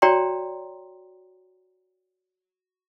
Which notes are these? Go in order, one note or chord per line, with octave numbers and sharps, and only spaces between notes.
F#4 C#5 D5 G5 A#5 C6